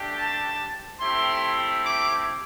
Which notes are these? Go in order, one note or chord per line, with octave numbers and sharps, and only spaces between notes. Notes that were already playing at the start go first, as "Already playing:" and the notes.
Already playing: A3 D4 G4
A5
A3 C4 E4 G4 C6
D6